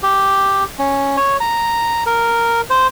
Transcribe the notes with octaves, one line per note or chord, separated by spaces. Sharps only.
G4
C#4
C#5
A#5
A#4
C5